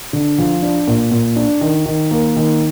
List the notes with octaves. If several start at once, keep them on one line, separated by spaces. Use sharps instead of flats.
D3
F3
D4
A#2
A#2
D4
D#3
D#3
A#3
D#3